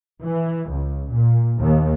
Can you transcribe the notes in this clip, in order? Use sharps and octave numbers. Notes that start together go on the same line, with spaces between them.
E3
C#2
A#2
D#2